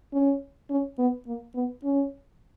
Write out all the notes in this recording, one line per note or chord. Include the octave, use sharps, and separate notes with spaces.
C#4
C#4
B3
A#3
B3
C#4